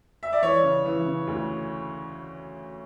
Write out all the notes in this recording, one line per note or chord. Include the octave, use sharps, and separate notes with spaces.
E5
D5
E3 C#5
C#3
E3
C#3
D2